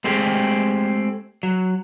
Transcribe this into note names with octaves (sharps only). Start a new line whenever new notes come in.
G#3 A3 C4 G4 G#4
F#3